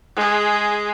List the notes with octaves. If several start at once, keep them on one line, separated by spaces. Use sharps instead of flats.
G#3 G#4